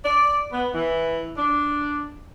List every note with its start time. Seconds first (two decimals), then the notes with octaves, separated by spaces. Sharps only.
0.04 D5
0.52 B3
0.74 E3
1.37 D4